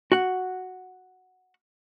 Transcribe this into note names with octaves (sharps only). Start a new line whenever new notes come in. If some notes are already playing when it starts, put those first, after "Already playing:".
F#4 F#5